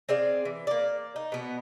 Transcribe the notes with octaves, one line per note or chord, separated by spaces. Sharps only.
C4 G#4 D5 F5
E3
A#3 D5
D#4
B2 B3